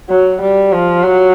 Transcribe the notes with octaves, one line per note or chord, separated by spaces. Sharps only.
F#3
G3
F3
F#3